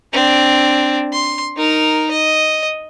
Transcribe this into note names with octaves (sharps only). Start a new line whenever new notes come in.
C4 D4
C6
D#4 A#4
D#5